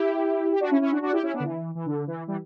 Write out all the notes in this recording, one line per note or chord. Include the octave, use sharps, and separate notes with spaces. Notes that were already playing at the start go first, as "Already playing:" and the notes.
Already playing: E4 G4
G4
D4 F#4
C#4 E4
C#4 E4
D4 F#4
D4 F#4
E4 G4
C#4 E4
B3 D4
D3
E3
E3
D3
E3
E3 G3